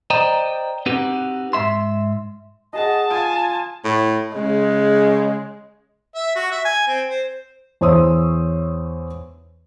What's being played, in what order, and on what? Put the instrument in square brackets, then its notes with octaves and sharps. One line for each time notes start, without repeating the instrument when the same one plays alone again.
[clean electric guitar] C5 D5 D#5 G5 A#5
C4 D#4 F#4 G4 B4
G#2 E5 C6
[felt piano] F#4 G#4 F#5 [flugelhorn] D#5 [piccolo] A5
[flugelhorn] F4 [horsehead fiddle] G#5 [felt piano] D#6
[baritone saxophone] A2
[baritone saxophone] C#3 [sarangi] G#3
[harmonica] E5
F#4
E5
G#5
C4
C5
[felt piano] E2 C5 C#5 C6 D#6 E6